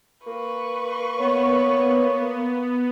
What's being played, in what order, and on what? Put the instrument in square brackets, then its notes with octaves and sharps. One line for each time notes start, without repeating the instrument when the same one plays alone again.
[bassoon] A#3 [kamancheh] B4 C#6
[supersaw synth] B3 [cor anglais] C#5